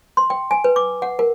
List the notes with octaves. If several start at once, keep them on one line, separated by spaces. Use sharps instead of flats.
C6
G5
G#5
B4
D6
F#5
A#4